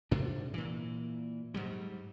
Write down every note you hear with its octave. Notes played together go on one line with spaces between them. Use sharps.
G#2 C3 D4
A#2 E3
G#2 F#3 G3